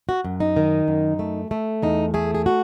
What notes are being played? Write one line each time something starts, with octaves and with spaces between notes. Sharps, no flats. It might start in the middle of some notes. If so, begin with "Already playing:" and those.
F#4
F#2
D#4
D#3
F#2
A3
A3
E2 D#4
A3 G#4
G#4
F#4